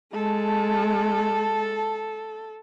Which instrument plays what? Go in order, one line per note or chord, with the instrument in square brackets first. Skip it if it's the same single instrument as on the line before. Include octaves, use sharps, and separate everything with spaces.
[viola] G#3 [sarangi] A4 [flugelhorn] A5